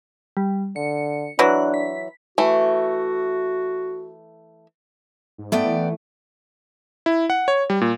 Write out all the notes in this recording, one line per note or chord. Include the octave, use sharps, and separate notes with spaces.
G3
D3 C#7
E3 F#3 D4 F#6
B6
E3 A3 F#4
G#2
A3 B3 D5 G5
E3
E4
F#5
C#5
G3
A#2